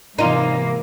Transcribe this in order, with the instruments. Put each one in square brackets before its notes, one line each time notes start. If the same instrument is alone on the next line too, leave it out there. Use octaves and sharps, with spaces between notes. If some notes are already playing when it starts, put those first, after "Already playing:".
[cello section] G#2 E3 A#3 [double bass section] C3 [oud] D#4 F4